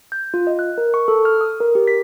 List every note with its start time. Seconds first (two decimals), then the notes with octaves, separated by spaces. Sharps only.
0.12 G6
0.34 F4
0.47 D#5
0.59 F#6
0.78 A#4
0.94 C#6
1.08 A4
1.25 F6
1.41 D#6
1.60 A#4
1.75 G4
1.88 B6